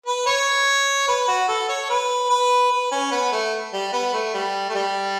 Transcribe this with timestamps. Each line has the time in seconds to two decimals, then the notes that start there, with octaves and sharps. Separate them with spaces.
0.06 B4
0.26 C#5
1.08 B4
1.28 F#4
1.48 A4
1.69 C#5
1.90 B4
2.30 B4
2.71 B4
2.91 C#4
3.11 B3
3.32 A3
3.73 G3
3.93 B3
4.13 A3
4.34 G3
4.69 A3
4.75 G3